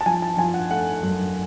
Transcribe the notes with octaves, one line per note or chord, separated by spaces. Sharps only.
A5
F3 G#5
A5
F3 G#5
F#5
A3 F#5
F#2